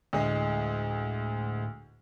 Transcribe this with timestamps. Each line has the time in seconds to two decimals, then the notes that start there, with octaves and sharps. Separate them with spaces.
0.13 D2 A2 G#3